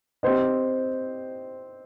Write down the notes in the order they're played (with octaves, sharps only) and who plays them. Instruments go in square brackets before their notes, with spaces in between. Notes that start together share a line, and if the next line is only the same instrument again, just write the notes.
[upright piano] C4 G4 C5 D#5